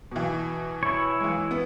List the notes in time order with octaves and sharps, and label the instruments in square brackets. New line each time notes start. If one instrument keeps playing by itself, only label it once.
[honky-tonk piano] B2 E3
[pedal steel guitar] E4 C#5
[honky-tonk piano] E3 G#3
B3